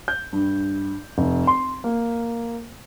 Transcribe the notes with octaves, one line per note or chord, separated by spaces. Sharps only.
G6
G2
F1
C6
A#3